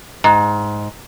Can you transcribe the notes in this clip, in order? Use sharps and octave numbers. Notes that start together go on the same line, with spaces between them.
G#2